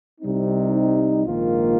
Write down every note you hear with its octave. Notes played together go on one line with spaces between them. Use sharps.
C2 C3 G3 C4 D#4
A#1 G#2 D#3 A#3 F4